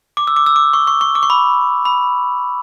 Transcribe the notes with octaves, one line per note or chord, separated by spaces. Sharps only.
D6
E6
D6
E6
D6
C#6
C#6
C#6
D6
C#6
B5
B5